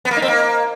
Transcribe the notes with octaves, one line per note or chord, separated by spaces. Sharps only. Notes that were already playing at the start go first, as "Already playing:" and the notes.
B3
A#3
D#4
C4
A#3